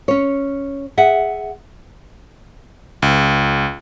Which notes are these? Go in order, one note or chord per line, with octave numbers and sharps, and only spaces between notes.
C#4 C#5
G#4 E5 F#5
C#2